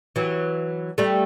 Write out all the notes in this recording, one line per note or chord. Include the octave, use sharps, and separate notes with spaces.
E3 F#3
G3 A3